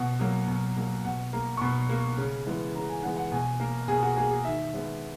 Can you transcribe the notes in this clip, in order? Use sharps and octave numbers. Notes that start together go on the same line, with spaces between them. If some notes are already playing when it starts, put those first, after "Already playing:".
Already playing: B2 F#5
F#3 A#3
B2
F#3 A#3
B2 F#5
A#3 A#5
C#6
B2 B5
A#3
C#3
E3 G#3 B3
C#3 A#5
G#5
E3 G#3 B3 F#5
F#5
B2 G#5
A#3 A#4
B2 G#4
F#4
A#3 G#4
G#4
D#3 E5
G#3 B3